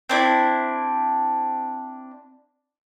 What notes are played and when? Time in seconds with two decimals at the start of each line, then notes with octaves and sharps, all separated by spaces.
0.09 C4 D4 E4